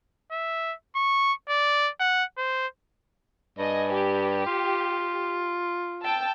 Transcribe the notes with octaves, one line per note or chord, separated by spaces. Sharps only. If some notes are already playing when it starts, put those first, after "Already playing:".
E5
C#6
D5
F#5
C5
G2 D#5 G#5
G4
F4
G5 A5 E6